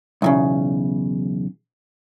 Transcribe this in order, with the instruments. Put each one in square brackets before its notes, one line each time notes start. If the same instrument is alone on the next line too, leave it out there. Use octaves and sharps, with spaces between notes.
[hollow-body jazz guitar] B1 E2 C#3